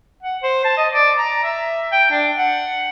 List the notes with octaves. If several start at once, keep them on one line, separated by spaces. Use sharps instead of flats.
F#5
C5
A5
D#5
D5
A#5
E5
G5
D4
F#5